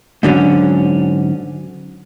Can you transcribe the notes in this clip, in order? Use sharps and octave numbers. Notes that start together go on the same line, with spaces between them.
G#2 D3 F#3 C#4